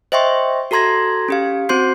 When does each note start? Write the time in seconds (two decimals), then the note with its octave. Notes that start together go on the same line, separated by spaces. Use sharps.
0.12 C5 D#5 E5 G5 C6 C#6
0.71 F#4 A4 A#5 C6 G#6 A#6
1.28 C#4 G4 F5
1.69 C4 F#4 C5 C6 G6 C7